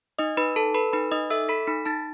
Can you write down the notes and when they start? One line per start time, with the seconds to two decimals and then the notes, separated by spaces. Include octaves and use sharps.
0.19 D#4 D#5 D#6
0.37 D#4 B4 B5
0.56 A4 A5
0.74 A4 B4 B5
0.93 D#4 B4 B5
1.12 D#4 D#5 D#6
1.30 A4 E5 E6
1.49 A4 B5 B6
1.67 D#4 B5 B6
1.85 D#4 A5 A6